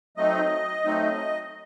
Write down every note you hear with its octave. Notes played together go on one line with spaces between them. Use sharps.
F#3 A3 C4 D#4 D#5
F#3 A3 C4 D#4